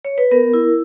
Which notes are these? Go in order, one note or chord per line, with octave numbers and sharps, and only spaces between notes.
C#5
B4
B3 A#4
E4